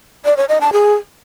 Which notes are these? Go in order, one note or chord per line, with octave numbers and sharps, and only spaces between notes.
D5
C#5
D#5
A5
G#4